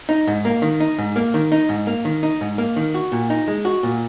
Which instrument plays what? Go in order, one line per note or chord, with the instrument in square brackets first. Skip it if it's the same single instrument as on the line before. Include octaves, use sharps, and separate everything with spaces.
[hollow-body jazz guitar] D#4
G#2
A#3
D#3
D#4
G#2
A#3
D#3
D#4
G#2
A#3
D#3
D#4
G#2
A#3
D#3
F#4
A#2
D#4
G#3
F#4
A#2